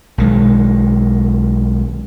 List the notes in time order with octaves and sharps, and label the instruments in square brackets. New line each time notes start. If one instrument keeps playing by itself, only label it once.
[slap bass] B1 D#3 G#3